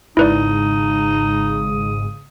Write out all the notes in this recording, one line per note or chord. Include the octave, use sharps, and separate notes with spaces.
G#1 G#2 C#3 D#4 E4 B4 D5 D#6